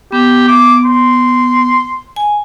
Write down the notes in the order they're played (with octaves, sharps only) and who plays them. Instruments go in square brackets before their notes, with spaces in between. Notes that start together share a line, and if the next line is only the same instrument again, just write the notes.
[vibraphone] B3 [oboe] G4
[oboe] D6
C6
[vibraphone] G#5